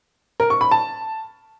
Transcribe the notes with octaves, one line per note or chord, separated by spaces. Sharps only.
A#4
C#6
B5
A5